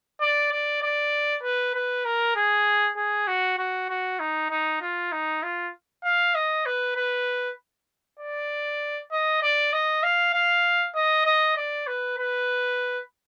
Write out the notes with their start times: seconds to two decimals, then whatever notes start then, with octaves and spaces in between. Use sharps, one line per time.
0.21 D5
0.52 D5
0.82 D5
1.43 B4
1.75 B4
2.05 A#4
2.36 G#4
2.97 G#4
3.27 F#4
3.58 F#4
3.89 F#4
4.20 D#4
4.50 D#4
4.82 F4
5.12 D#4
5.43 F4
6.04 F5
6.35 D#5
6.66 B4
6.96 B4
8.19 D5
9.12 D#5
9.42 D5
9.73 D#5
10.03 F5
10.34 F5
10.95 D#5
11.25 D#5
11.57 D5
11.87 B4
12.18 B4